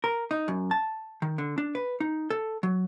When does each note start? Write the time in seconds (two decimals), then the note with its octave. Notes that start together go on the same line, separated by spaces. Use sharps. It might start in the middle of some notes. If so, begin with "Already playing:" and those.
0.04 A#4
0.31 D#4
0.48 F#2
0.71 A5
1.22 D#3
1.38 D3
1.58 D4
1.75 B4
2.00 D#4
2.30 A4
2.63 F#3